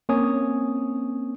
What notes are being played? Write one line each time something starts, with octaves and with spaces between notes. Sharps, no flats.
A#3 C4 C#4 C#5 G#5 D#6